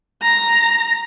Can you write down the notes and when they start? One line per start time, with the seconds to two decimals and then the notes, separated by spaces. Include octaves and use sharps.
0.22 A#5